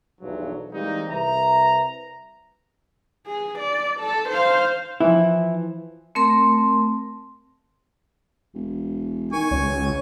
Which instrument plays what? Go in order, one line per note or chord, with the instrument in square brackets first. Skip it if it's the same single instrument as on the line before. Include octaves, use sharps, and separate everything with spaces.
[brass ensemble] B1 E2 G2 F3 F#3
E3 G3 G#3 A#3 C4 D#4
C2 B4 E5 A#5
[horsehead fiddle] G#4
D5
A4
C5 F5
[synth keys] E3 F3 [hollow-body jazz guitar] E4
[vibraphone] A3 C4 A#4 C6
[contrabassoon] E1
[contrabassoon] D#3 [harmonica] G#5 C#6
[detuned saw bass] C#2 [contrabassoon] F#2 [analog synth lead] C#5